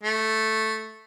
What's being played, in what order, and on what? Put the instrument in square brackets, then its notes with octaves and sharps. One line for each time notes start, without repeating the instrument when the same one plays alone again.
[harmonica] A3